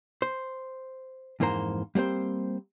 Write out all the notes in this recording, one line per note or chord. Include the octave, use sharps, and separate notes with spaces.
C5
F2 G#2 E3 A#3 C5 A#5
G3 A#3 C4 C5